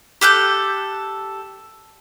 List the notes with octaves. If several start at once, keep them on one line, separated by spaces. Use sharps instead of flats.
G4 A4 F#6 G6